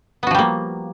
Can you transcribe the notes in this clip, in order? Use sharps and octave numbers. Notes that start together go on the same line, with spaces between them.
F3 G3 A#3 B3 F#4